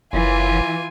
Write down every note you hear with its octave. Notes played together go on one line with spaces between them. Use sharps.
F#1 E3 F4 G#5